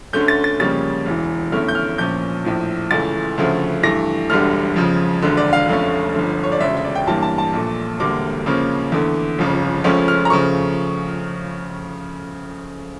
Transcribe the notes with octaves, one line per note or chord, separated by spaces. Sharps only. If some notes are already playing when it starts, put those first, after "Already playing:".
D2 D3 A3 C#4 G6
A6
A6
F2 C#3 G3 A#3 C#4 A6
E1 E2 E3
F1 E2 D3 A3 C#4 F6
G6
F6
A#1 A#2 F3 C#4 G6
A#1 A2 F3
C#2 C#3 E3 A3 A6
D2 C#3 F3 A3
G2 E3 A3 A#6
E1 D2 D3 G3 F6
F2 C#3 F3
E1 D2 D3
D5
F5
F1 F2 D3 A3 C#4
G1 F2 D3
C#5
D5
E1 D2 C#3 E5
E5
D5
G5
A1 G2 E3 G3 A#3 A5
A5
A5
A#1 A#2 A3
E1 D2 D3 G3 A#3 D6
F2 C#3 F3 A#3 C#4
E2 D3 A3
G1 F2 C#3
C#2 C#3 F3 A3 C#4
F6
A#5
C#3 F3 A3 C#6